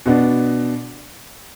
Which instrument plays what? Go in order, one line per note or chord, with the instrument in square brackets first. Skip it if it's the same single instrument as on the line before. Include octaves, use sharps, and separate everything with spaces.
[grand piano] B2 B3 D4